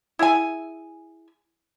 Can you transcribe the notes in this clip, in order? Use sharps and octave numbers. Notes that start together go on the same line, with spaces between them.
E4 G#4 E5 G#5